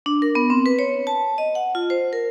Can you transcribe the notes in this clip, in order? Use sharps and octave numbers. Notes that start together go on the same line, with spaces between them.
D4
A#4
B3
C4
B4
C#5
A5
D#5
F#5
F4
C5
A#4